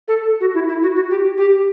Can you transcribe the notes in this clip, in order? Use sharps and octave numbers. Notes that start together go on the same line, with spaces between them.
A4
F#4
E4
E4
F#4
F#4
G4
G4